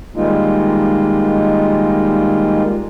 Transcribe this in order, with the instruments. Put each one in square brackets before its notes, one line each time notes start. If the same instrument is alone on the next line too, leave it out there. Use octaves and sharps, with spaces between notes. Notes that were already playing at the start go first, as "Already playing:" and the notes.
[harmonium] D#3 G3 G#3 A#3 D#4 F4